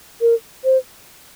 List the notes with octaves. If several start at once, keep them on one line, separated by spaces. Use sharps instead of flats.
A#4
C5